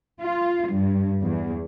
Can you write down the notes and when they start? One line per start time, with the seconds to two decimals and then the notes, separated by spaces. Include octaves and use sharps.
0.19 F4
0.69 G2
1.22 E2